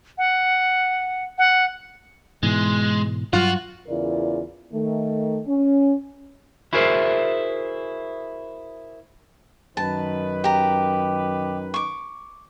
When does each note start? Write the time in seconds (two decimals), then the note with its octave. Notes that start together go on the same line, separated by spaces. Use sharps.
0.18 F#5
1.38 F#5
2.43 G#2 B2 E3 G#3
3.33 G2 F#3 G3 F4 F#4
3.88 E2 C#3 E4 F4 A#4 D5
4.73 D#3 A3
5.47 C#4
6.73 E4 F#4 G#4 A#4 C5 E5
9.77 F#2 D#3 B4 A5
10.44 G4 A#5
11.74 C#6 D6